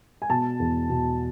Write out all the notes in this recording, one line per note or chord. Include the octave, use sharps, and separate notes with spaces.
G#5
B2 A5
E2
B2